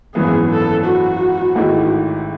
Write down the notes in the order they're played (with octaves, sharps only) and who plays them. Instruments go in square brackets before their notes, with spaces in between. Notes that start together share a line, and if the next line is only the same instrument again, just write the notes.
[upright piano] G#1 F#2 E3 B3 [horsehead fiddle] G#4
[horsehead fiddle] A4
F#4
[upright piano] A1 G#2 D#3 A3 E4